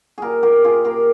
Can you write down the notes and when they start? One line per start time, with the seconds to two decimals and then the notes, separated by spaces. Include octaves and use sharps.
0.18 A#2 G4 G#4 A#4
0.43 A#2 G4 A#4
0.64 A#2 F4 G#4
0.85 A#2 G4 A#4